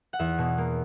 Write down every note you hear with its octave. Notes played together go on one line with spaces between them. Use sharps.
F#5
E2 E5
B2
A#3